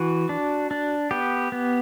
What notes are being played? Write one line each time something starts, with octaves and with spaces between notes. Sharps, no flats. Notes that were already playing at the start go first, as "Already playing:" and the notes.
Already playing: E3 F#4
D4
D4
B3 G4
B3